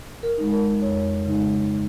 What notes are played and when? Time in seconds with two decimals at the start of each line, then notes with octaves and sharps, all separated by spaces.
0.23 A#4
0.38 G#3 D#4
0.52 A#4
0.82 F2 C#5
1.25 C#3 G#3 D#4